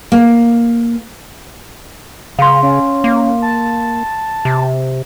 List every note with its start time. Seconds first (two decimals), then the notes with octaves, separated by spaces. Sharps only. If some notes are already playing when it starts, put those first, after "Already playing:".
0.12 A#3
2.39 C#3 F5 C6
2.63 C#4
3.04 A#3
3.42 A5
4.45 C3